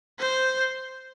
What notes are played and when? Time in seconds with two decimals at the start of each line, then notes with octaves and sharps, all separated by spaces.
0.20 C5